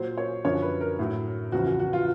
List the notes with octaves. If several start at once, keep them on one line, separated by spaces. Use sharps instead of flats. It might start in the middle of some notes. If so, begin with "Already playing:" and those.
Already playing: A#2 F#3 C5
C#5
F#2 D3 F3 C#5
B4
A#4
A2 F#3
E2 C#3 F3 F#4
F#4
F#4
F4